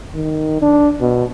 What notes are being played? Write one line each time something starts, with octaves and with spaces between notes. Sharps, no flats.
D#3
D4
B2